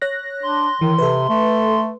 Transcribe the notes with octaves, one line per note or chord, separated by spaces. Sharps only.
C#5 F#6 A#6
D4 C6
D#3 E3
C3 A4 B4
A3